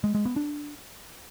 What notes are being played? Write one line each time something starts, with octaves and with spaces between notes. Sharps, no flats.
G#3
G#3
B3
D4